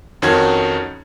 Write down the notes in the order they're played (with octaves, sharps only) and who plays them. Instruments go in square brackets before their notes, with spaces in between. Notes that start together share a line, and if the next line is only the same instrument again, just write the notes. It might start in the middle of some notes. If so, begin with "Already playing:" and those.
[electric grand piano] F2 D#3 C#4 D#4 F#4 G#6